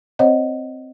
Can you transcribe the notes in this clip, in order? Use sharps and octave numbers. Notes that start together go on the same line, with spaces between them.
C4 C5 C#5 D#5 F#5